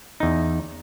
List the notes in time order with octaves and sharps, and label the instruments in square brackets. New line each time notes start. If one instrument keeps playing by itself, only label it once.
[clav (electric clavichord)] E2 D#4